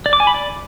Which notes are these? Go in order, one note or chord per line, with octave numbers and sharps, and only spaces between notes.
D5
D6
G#5
B5
D5